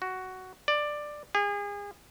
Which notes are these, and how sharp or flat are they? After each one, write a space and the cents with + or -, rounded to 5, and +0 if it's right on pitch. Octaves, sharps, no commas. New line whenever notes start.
F#4 +10
D5 +15
G#4 -35